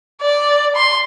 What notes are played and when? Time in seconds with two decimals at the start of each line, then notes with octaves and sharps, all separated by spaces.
0.21 D5
0.76 C6